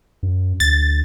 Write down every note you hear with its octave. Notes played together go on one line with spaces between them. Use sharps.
F#2
D2 A6